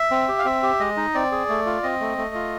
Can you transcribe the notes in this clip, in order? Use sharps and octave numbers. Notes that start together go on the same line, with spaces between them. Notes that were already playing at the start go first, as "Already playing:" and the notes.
Already playing: E5
C4
G4
F5
C4 E5
G4
G#3 D#5
D#4
C4 D5
G#4
A3
F4
C4 D#5
A3
A3
F4